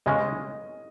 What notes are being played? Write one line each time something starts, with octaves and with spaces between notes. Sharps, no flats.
C#3 G#3 C#4 D#5